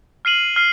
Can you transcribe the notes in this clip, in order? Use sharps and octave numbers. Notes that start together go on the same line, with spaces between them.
F6 C7 D#7 F#7
F6 C7